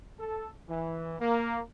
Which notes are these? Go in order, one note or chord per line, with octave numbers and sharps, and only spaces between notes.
A4
E3
A#3